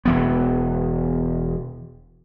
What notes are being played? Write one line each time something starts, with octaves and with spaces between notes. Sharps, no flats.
E1 E3 B3